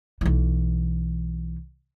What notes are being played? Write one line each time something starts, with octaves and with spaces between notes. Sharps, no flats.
B1 E3